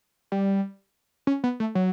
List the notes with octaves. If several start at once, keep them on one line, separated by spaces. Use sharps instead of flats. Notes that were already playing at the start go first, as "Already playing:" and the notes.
G3
C#4
B3
A3
F#3